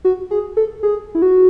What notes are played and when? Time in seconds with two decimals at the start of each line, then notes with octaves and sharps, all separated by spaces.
0.05 F#4
0.31 G#4
0.57 A4
0.83 G#4
1.15 E4
1.22 F#4